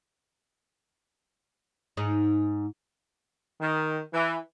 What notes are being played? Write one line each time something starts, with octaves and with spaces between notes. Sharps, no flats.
G#2 D#4
D#3
E3